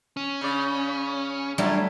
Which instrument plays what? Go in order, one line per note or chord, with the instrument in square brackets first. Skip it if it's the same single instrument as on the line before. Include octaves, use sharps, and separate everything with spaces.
[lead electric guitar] C#4
[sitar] C#3 D5
[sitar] D3 E4 F4 [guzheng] F#3 G3 A3